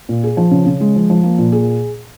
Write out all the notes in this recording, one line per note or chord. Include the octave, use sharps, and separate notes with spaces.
A#2
G#4
F3
C#3
C#3
G#3
F3
F3
A#3
A#2
G#4